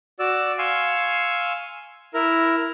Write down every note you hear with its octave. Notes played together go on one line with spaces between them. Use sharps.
F#4 D5 E6
F5 G#5 C6 C#6 E6
E4 A#4